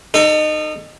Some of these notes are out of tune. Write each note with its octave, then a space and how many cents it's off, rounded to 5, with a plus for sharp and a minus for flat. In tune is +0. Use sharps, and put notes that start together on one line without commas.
D#4 -20 A4 +25